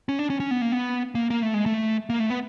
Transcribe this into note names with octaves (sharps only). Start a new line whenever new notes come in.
C#4
D4
C#4
C#4
B3
A#3
B3
A#3
A#3
A3
G#3
A3
A#3
A3
B3